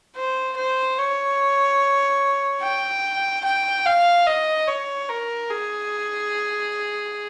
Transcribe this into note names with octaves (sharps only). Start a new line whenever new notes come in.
C5
C5
C#5
G5
G5
F5
D#5
C#5
A#4
G#4